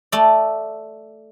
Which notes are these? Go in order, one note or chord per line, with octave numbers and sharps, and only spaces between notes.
A3 D5